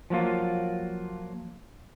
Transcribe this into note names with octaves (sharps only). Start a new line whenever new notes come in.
F3 F#3 A#3 F4